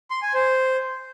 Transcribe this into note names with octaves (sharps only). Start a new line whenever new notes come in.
C6
G#5
C5